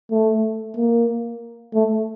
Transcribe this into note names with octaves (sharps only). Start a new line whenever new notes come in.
A3
A#3
A3